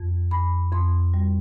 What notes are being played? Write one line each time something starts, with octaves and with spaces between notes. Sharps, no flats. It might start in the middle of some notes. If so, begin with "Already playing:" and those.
Already playing: F2
F2 B5
F2 C6
G3